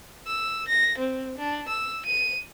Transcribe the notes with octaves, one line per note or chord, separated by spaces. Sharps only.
E6
A#6
C4
D4
E6
D#7